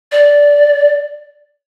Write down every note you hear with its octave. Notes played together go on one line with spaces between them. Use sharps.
D5